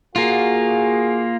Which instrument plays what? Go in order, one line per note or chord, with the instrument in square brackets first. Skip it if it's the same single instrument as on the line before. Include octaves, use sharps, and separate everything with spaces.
[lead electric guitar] A#3 F4 [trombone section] F#4 G#4